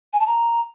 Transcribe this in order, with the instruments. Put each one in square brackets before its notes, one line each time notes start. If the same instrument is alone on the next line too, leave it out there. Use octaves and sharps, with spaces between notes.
[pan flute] G#5
A5
A#5